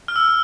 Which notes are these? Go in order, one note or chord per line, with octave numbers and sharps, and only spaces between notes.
F6
E6